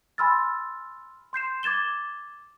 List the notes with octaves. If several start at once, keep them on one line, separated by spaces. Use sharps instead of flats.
G#5 B5 C6 E6 F6 A6
C6 G6 C7 E7
D6 G#6 A6 E7 G7